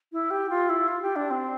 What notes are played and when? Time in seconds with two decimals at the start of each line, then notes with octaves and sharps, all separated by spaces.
0.12 E4
0.30 G4
0.50 F4
0.69 E4
0.88 F4
1.02 G4
1.16 D4
1.30 C4